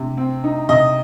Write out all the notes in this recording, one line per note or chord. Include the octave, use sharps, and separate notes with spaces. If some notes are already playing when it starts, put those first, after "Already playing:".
Already playing: C3
C4
D#4
C3 D#5